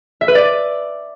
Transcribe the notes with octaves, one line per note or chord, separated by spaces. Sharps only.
E5
B4
D5